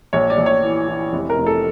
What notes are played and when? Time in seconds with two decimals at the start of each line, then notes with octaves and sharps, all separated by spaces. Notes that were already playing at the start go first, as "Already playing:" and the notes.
0.13 A#1 C#5
0.30 D5
0.38 A#1
0.46 C#5
0.63 E3
0.88 E3
1.13 F1
1.30 A#4
1.38 F1
1.46 A4